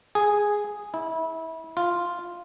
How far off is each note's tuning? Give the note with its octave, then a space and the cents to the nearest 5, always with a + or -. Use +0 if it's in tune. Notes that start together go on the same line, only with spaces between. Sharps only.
G#4 -5
E4 -25
F4 +0